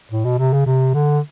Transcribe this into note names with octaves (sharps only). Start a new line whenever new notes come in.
A2
B2
C3
C#3
C3
D3